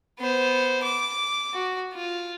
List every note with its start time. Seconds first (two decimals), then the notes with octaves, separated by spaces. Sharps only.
0.19 B3 C5
0.83 D6
1.53 F#4
1.94 F4